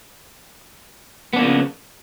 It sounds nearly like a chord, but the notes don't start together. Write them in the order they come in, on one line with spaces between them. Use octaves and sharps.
B3 D4 A#3 F3 C#3